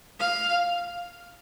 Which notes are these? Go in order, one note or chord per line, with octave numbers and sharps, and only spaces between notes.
F5